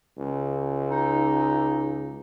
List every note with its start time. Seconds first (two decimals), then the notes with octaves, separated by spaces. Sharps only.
0.18 C#2
0.90 D#4